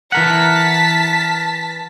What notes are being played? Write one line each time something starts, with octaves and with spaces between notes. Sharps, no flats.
E3 A#4 F#5 A5 B6